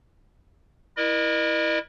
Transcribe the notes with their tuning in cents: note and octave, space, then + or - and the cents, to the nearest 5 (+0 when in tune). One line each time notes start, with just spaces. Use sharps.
E4 -5 A#4 +35 D#5 -40